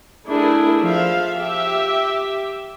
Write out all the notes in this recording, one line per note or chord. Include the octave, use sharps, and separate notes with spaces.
A3 D4 E4 G#4 A#4
F3 E5 F5
G4 E5